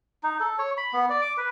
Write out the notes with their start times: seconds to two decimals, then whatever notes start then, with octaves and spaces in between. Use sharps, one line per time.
0.23 D#4
0.40 A4
0.58 C#5
0.77 B5
0.93 B3
1.10 D5
1.21 D6
1.38 B4